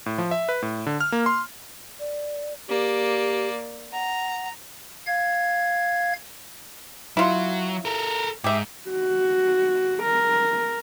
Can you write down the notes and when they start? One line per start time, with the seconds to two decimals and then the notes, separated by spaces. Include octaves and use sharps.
0.06 A2
0.18 F3
0.31 E5
0.49 B4
0.62 A2
0.87 D3
1.01 F6
1.12 A#3
1.26 C6
2.00 D5
2.69 A#3 G4 D5
3.93 F#5 A#5
5.07 F5 G#6
7.17 F#3 E4 F4
7.85 A4 A#4
8.44 G#2 G4 E5
8.90 F#4
10.03 A#4